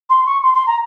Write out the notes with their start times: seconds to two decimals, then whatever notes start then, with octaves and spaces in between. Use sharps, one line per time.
0.09 C6
0.26 C#6
0.42 C6
0.54 C6
0.66 A#5